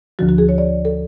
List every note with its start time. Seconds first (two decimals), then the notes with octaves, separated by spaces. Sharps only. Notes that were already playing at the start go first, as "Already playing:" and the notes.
0.19 D2 D3 F3 F#4
0.29 F#4
0.38 G#4
0.49 C#5
0.58 D5
0.85 A4